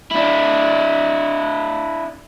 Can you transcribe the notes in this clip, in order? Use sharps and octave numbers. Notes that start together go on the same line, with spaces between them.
D4 E4